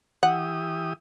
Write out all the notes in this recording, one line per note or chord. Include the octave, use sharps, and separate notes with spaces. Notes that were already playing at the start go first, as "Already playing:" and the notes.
E3 G4 F#5 D#6